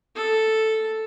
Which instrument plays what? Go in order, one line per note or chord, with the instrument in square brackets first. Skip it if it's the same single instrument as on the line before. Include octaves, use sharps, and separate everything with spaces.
[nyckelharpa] A4